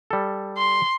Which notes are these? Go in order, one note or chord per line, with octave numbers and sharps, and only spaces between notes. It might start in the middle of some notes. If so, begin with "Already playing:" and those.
G3 A4
C6